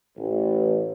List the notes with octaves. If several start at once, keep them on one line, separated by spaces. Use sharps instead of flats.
A1